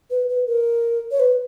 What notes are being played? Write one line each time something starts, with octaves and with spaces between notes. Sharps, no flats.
B4
B4
A#4
C#5
B4